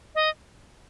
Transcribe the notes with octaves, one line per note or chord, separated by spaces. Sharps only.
D#5